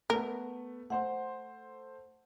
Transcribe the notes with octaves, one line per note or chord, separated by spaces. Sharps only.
A3 B3 A#4
A3 C5 F#5 C6